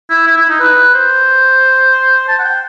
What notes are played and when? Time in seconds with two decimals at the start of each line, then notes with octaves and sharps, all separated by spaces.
0.10 E4
0.27 E4
0.38 E4
0.50 D#4
0.60 B4
0.94 C5
2.28 A5
2.39 F#5
2.44 G5